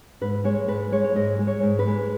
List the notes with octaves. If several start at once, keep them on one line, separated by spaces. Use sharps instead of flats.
G#2 B4
G#3 C#5
G#2 B4
G#3 C#5
C#5
G#2 D#5
G#3
C#5
G#2
B4
G#3